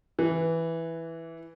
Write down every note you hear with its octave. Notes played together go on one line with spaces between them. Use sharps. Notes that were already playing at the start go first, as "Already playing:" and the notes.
E3